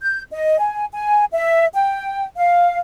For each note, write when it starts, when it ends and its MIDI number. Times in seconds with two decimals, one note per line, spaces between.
0.01 0.22 91
0.31 0.59 75
0.59 0.85 80
0.93 1.24 80
1.32 1.65 76
1.74 2.25 79
2.37 2.77 77